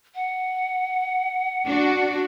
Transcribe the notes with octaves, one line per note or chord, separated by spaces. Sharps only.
F#5
D4 F#4